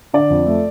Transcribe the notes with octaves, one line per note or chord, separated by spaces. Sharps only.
D3 D5
F2
A3